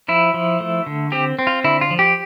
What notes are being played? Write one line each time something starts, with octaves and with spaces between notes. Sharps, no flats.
F3 E4
F3
A3
D3
C4 G4
C4
F4
D3 E4
F4
F3
G4